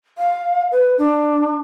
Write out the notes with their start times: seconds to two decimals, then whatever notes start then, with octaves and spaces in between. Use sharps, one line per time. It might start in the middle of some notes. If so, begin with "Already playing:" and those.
0.18 F5
0.72 B4
0.98 D4